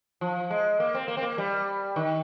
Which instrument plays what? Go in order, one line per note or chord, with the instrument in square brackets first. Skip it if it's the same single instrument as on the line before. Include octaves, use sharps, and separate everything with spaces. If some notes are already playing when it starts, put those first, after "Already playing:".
[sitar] F3
G#3
A#3
C4
A#3
C4
A#3
G3
D#3